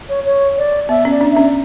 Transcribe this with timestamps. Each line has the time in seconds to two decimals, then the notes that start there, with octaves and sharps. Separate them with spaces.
0.09 C#5
0.25 C#5
0.58 D5
0.89 B3 E5
1.05 C#4
1.11 D5
1.21 D4
1.32 C#4 E5